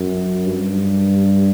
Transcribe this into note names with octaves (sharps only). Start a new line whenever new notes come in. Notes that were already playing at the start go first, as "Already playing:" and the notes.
Already playing: F#2
G2